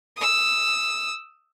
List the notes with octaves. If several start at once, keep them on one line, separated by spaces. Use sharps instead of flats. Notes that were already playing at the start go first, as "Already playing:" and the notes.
D#6 E6